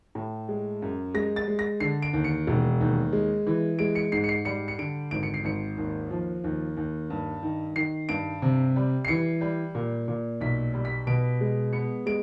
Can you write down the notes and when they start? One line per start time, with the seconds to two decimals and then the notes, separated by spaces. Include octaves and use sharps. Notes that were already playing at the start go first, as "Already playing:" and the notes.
0.15 A2
0.49 G#3
0.82 F#2
1.14 G#3 A#6
1.36 A6
1.48 G#3
1.59 A#6
1.80 D3 C7
2.02 D7
2.13 D#2
2.24 C#7
2.47 E1
2.81 D#2
3.13 G#3
3.47 E3
3.79 G#3 D7
3.95 C#7
4.12 G#2 C7
4.24 C#7
4.29 C7
4.45 G3 C#7
4.68 C#7
4.78 D3 D7
5.11 G#1 D7
5.23 C#7
5.34 C7
5.44 G#1 C#7
5.78 D#2
6.11 F3
6.44 D#2
6.77 D#2
7.10 G2
7.43 D#3
7.76 D#3 C7
8.09 G2 D7
8.42 C3
8.76 G3
9.05 C7
9.08 E3 C#7
9.41 G3
9.75 A#2
10.08 A#2
10.40 B1 B6
10.74 G3
10.85 B6
11.07 B2 D7
11.41 G#3
11.73 B3 C#7
12.06 G#3 D7